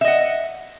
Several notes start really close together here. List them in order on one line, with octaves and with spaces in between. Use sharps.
E5 D#5 F#5